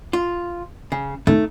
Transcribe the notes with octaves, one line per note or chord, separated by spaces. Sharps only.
F4
C#3
A3 D#4